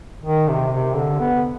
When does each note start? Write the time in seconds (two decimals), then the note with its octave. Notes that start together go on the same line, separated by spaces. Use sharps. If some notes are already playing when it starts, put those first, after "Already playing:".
0.24 D#3
0.48 C3
0.72 C3
0.96 D3
1.20 B3